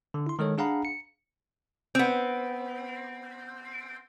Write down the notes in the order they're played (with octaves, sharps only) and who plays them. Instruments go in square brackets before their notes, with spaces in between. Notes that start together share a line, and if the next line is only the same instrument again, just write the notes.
[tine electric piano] D3
E4 C6
D#3 G#3 A4 C#5
D4 G#4 F5 F#5 A#5 B5
C#7
[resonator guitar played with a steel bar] B3 C4